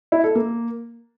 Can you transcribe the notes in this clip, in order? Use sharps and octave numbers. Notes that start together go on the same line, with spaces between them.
E4
A4
A#3